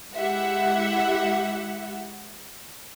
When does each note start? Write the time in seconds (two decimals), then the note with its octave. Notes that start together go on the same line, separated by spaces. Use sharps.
0.13 G#3 E4 G4 E5 F#5